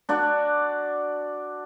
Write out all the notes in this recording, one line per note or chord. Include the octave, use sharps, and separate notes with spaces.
D4 F#4 D5